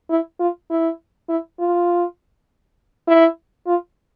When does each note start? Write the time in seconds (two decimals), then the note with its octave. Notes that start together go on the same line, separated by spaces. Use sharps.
0.10 E4
0.40 F4
0.70 E4
1.29 E4
1.59 F4
3.08 E4
3.67 F4